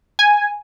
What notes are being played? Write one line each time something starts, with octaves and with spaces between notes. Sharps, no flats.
G#5